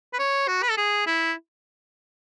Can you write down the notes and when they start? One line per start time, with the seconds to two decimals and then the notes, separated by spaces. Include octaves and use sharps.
0.13 B4
0.19 C#5
0.48 F#4
0.63 B4
0.70 A4
0.77 G#4
1.07 E4